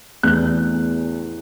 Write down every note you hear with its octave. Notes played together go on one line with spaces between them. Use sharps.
E2 E3 A3 D4 F#6